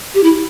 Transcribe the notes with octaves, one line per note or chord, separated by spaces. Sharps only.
G4
E4